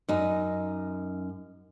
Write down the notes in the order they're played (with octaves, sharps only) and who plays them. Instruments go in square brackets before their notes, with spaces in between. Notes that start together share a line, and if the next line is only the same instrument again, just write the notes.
[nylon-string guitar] F#2 D#4